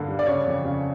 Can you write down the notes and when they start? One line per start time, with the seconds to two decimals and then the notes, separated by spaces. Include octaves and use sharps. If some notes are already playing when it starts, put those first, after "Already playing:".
Already playing: G2 D3 A#3
0.08 G3
0.19 D5
0.26 C#3 C#5
0.46 F2
0.65 C#3